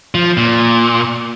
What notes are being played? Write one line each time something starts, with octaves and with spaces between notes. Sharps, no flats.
F3
A#2